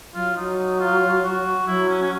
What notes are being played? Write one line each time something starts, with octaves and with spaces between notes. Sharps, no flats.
F#3 F4
F#3 D#4
F4
F#4
F#3 E4
C#4
C#4